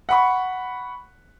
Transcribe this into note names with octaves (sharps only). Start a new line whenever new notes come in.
F#5 B5 C#6